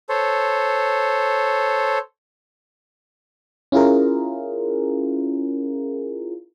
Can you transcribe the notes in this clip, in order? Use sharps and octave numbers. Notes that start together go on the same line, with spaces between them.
A4 C5 C#5
C#4 E4 F4 G#4 A#4